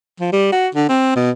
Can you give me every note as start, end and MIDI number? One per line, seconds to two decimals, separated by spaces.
0.20 0.32 53
0.32 0.49 55
0.52 0.68 66
0.75 0.88 50
0.89 1.12 60
1.16 1.31 47